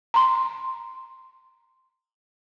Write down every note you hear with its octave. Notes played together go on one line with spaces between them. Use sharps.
A#5 C6